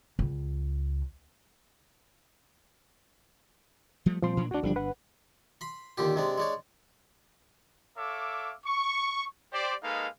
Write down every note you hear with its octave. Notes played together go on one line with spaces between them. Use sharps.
C#2
F3 G3 A3
A#2 F3 G3 C4 C6
A#2 F#3 D4
D2 D#3 D4 F#4
G1 A#2 D3 F3 G3 D4
B4 F#5
B5 C6
D#2 A#2 D3 G4
C3 G#3 D4
G#3 D4 C#5
A4 C#5 E5 F5 D6
C#6
G4 C5 D5
G#3 A#3 D#4 A4 B4 F5